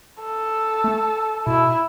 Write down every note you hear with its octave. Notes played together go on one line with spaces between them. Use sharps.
A4
A3
B2 E4